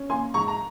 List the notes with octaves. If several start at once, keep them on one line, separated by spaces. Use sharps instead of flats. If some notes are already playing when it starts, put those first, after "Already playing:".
Already playing: C#4
A#3 G#5 C6
G#2 A#5 C#6
A#5